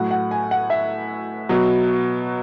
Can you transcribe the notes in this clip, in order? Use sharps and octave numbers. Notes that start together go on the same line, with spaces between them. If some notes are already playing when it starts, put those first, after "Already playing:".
Already playing: A2 F#3 F#5
F#5
G#5
F#5
E5
B2 F#3